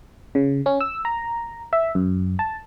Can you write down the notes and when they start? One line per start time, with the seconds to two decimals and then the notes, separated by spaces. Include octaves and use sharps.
0.35 C#3
0.66 C#4
0.81 E6
1.05 A#5
1.73 E5
1.95 F#2
2.39 A5